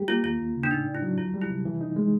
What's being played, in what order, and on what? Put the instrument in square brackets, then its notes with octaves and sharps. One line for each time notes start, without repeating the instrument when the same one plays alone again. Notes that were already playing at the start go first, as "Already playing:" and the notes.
Already playing: [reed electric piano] G3 G4
[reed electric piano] A#3 [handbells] F4
[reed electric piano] D#2 [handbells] F4
[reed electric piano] D#2
C#3
[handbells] D4
[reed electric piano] A2 [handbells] D#4
[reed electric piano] D4
[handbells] E4
[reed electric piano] F#3
[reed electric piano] D2 [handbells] F4
[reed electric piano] G3
[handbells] E4
[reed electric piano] C3
E3
D#4
G#3